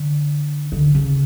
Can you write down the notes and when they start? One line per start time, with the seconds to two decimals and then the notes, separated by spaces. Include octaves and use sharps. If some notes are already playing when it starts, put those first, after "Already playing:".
Already playing: D3
0.72 D3
0.95 C#3